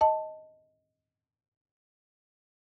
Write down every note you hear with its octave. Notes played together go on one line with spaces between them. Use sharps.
D#5 A5